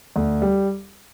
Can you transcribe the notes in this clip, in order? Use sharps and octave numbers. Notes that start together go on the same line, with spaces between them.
D2
G3